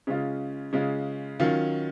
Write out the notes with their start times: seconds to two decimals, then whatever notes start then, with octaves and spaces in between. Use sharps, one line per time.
0.07 C#3 G#3 C#4 F4
0.73 C#3 G#3 C#4 F4
1.40 D#3 F#3 C#4 F4